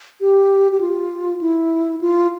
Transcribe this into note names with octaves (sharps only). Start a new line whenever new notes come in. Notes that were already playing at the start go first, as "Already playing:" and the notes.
G4
G4
F4
E4
F4